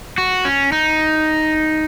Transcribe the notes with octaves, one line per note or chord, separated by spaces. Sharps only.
F#4
C#4
D#4